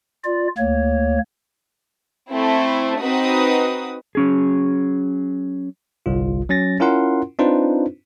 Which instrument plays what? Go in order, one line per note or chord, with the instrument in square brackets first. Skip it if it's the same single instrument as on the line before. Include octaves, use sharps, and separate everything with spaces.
[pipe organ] F4 D5
D2 A#3 C#5
[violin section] A3 C4 E4
C4 D#4 F#4 B4 D#6
[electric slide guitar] F#3 C#4 G#4
[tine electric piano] G1 C2 F4
F#3 C#4 A6 A#6
C#4 E4 F4 A#4 F#5 C6
C4 D4 D#4 F4 B4 C5